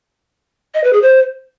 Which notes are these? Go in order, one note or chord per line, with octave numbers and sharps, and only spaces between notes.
D#5
B4
G#4
C5